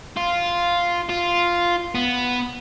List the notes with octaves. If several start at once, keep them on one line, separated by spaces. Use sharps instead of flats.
F4
F4
B3